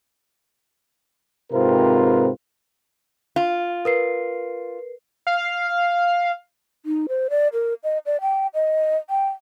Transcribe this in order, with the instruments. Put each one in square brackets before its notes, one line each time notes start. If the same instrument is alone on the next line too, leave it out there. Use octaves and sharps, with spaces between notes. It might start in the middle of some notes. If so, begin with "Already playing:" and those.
[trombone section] G#2 C3 C4 F4 A#4 B4
[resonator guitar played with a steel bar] F4
[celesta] A#4 B4 C7
[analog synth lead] F5
[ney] D#4
C5
D5
A#4
D#5
D5
G5
D#5
G5